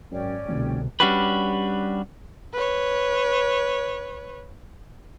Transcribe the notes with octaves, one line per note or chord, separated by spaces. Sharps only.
G#1 F#2 C#4 D5 G5
F1 C2 B2 D3
G3 C#4 D4 F#4 G4 B4
B4 C#5